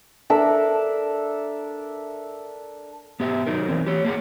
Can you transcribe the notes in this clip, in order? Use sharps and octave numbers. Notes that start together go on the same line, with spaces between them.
D4 A4 A#4 E5
B3 G4 E5
F#3 D#4 A#4
E3 C4
G4 C#5
A#3 G#4 C#5